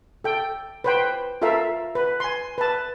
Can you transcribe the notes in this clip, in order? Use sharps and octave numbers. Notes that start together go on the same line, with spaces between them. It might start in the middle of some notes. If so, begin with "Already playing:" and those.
A4 G5
B4 C5 G5
F4 A4 A#4 E5 F5
B4
G#5 C6
B4 A5